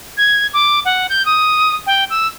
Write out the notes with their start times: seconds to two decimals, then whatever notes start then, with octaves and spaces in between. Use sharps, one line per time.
0.17 G#6
0.53 D6
0.85 F#5
1.10 G6
1.26 D#6
1.87 G5
2.10 E6